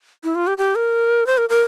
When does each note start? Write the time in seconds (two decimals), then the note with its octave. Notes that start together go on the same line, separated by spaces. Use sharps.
0.24 E4
0.35 F4
0.47 G4
0.58 G4
0.75 A#4
1.27 C5
1.38 A#4
1.49 A#4